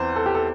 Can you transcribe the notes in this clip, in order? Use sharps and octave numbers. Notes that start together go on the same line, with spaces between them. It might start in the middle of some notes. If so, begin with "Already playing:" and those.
Already playing: E2 E3 C4 C5
A4
G4
A4